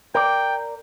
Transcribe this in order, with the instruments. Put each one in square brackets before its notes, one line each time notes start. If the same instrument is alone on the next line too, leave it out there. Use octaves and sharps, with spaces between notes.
[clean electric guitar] A#4 D5 [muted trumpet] G5